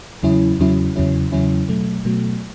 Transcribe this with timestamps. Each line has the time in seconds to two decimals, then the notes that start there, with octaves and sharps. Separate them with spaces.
0.23 E2 C#3 F#3 C#4 E4
0.59 E2 C#3 F#3 C#4 E4
0.96 E2 C#3 F#3 C#4 E4
1.32 E2 C#3 F#3 C#4 E4
1.69 B2 F#3 A3
2.05 B2 F#3 A3